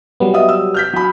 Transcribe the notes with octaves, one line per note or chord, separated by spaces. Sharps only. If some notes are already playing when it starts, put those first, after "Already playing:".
F#3 G3 B3
D#5 E5 D#6
E6
F6 G6 B6
F#3 B5